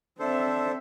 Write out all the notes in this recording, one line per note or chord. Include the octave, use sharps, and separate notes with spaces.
C4 D4 A4 C5 E5